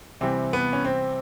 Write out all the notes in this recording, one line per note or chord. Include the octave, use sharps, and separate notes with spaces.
C3 E3 G3 C4
B3
C#4
C4